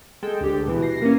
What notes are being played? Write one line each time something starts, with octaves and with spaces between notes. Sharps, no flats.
G#3 A4 G5
D2 G4
B2 E3
A#6 C7
A#3 C#4